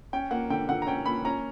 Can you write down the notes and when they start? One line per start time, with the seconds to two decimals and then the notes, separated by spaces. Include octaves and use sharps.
0.13 C#4 G5
0.31 A#3 F#5
0.50 D3 G5
0.69 D3 F#5
0.82 A#5
0.87 C#4 G5
1.06 A#3 B5
1.25 C#4 A#5